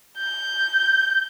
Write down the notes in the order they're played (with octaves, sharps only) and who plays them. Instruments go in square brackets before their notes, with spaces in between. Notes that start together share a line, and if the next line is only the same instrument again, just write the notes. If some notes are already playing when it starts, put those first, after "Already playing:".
[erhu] G6